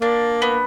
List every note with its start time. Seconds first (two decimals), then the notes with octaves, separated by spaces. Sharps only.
0.01 A#3 D4
0.42 B3